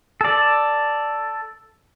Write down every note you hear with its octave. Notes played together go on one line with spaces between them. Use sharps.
A4 D5